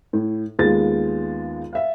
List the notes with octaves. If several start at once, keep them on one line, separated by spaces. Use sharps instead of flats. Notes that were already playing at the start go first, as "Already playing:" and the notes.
A2
D#2 G#3 B3 F4 A6
E5 F5